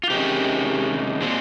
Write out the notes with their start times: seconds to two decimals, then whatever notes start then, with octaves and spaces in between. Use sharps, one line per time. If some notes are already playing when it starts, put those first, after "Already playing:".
0.03 F4
0.10 C3 D#3 G#3 C#4 G4
1.20 A#2 G#3 C4